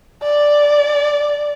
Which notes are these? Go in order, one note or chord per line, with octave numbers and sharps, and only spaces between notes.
D5